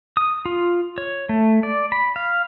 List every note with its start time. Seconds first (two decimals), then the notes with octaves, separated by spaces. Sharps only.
0.17 D#6
0.46 F4
0.98 C#5
1.29 A3
1.63 D5
1.92 B5
2.16 F5